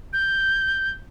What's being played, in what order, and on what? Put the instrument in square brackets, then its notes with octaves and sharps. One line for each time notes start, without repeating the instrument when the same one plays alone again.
[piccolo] G6